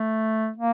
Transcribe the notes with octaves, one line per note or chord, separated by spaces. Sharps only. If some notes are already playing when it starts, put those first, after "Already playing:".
Already playing: A3
A#3